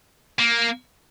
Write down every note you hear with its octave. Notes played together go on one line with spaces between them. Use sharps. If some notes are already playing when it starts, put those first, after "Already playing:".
A#3